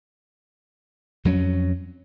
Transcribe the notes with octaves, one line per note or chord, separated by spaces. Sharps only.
F2 F#3 C4 C#4